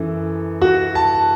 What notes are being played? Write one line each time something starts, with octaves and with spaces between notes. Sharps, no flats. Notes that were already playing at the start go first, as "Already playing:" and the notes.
Already playing: F#2 E3 A4
F#4
A5